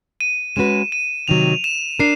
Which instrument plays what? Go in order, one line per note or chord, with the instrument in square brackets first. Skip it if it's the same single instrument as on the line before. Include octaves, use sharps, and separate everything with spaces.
[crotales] D#7
[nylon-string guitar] G#3 C#4 F#4 B4 [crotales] E7
[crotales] D#7
[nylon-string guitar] C3 D#3 F#3 [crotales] F7
[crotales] E7
[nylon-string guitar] D4 A#4 [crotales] C7